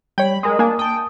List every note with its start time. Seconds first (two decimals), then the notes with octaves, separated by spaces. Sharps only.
0.18 G3 C#5 G5 B5
0.43 G#3 A#4 D#6
0.59 A#3 D4 G#5
0.79 G5 A5 D#6